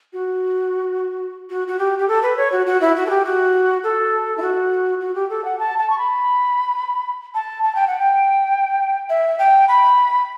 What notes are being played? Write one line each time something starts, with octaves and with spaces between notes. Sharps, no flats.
F#4
F#4
F#4
G4
G4
A4
B4
C#5
F#4
F#4
E4
F#4
A4
G4
F#4
A4
E4
F#4
F#4
G4
A4
F#5
A5
A5
C#6
B5
A5
A5
G5
F#5
G5
E5
G5
B5